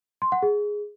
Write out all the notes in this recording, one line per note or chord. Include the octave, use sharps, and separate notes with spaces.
C6
F#5
G#4